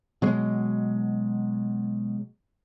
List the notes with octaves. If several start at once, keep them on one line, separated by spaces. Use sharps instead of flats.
B2 F#3 G#3